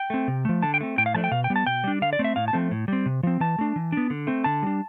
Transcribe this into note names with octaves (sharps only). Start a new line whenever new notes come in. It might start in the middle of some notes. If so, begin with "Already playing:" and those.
Already playing: G5
A3 C4
C3
F3 A3
D3 A5
G5
A3 C4
A2 G5
F5
F3 A3 D4 A5
G5
B2 F5
G5
G3 B3
A5
B2 G5
G3 D4
D3 F5
D5
A3 C4
E5
A2 F5
A5
F3 A3 C4
A2
G3 C4
C3
F3 C4
E3 A5
A3 D4
E3
B3 D4
D3
A3 C4
D3 A5
G3 D4